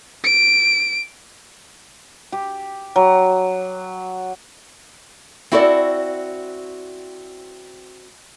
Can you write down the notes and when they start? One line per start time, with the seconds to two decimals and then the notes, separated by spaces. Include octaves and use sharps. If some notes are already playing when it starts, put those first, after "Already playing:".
0.24 D7
2.32 G4
2.96 F#3
5.52 C4 E4 F#4 A4 C5 D5